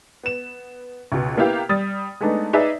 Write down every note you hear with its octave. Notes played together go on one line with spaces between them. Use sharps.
B3 E7
C#2 B2
A#3 B3 E4 G4 F5
G3 D#6 A6
G#3 A3 B3 D4 D#4
D#4 G#4 B4 D5 E5